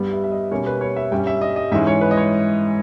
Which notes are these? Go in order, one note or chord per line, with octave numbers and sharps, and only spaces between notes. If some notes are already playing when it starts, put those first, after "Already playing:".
Already playing: G2 G3 B3
E5
E5
D#5
B2 G3 A#3 C#4 C#5
B4
C#5
E5
G2 G3 C#4 G5
E5
D#5
D#5
G#2 E3 G#3 C#4 E5
C#5
B4
D#5
C#5